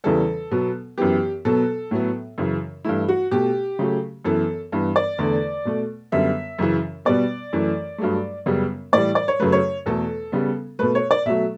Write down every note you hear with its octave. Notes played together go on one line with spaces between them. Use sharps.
E2 C#3 E3 G3 A4
B2 F#3 B3
F#2 E3 B3 G4
B2 F#3 B3 A4
A2 F#3 B3
F#2 C#3 E3
G2 E3 A3 E4
F#4
B2 A3 G4
C#3 F#3 A3
F#2 E3 B3 A4
G2 E3 B3
D5
E2 D3 A3
B2 A3
F#2 D3 G3 B3 E5
F#2 C#3 E3
B2 G3 B3 D5
F#2 E3 A3
G2 F#3 A3
F#2 C#3 G3 B3
A2 E3 G3 D5
D5
C#5
F#2 C#3 F#3 A3 B4
C#5
E2 B2 A3 A4
C#3 G3 B3
B2 A3 B4
C#5
D5
B2 F#3 A3 E5